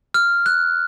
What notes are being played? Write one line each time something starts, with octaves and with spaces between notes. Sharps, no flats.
F6
F#6